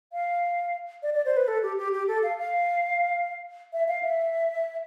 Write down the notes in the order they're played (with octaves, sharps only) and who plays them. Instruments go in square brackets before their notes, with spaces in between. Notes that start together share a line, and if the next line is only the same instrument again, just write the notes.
[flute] F5
D5
D5
C5
B4
A4
G4
G4
G4
A4
F5
F5
E5
F5
E5